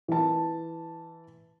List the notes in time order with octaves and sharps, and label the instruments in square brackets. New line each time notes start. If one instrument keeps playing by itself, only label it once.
[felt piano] E3 A5